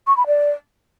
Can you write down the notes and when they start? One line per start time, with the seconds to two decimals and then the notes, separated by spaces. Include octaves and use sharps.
0.07 C#6
0.17 B5
0.27 D5